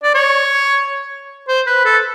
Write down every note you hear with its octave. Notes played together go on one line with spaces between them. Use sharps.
D5
C#5
C5
B4
A4